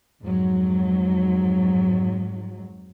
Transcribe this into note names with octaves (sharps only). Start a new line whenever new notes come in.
F2 G#2 F#3